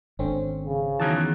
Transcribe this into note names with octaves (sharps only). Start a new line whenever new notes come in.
G#1 D3 C4 C#4
C#3
E2 D#3 E3 F#3 A5